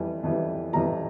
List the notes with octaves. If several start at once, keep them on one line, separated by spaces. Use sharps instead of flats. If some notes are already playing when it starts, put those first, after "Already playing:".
Already playing: F2 E3 G3
F2 E3 G3
F2 E3 G3 A#5